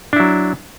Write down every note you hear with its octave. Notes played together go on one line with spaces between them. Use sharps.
F#3 D4 E4